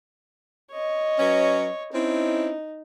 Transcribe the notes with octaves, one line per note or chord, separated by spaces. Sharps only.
C#5 D#5
F#3 C#4 B4
C4 C#4 D#4 E4